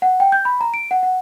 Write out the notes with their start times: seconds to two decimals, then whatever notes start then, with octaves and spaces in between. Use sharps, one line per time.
0.02 F#5
0.20 G5
0.32 G6
0.45 B5
0.61 A#5
0.74 D7
0.91 F#5
1.03 F#5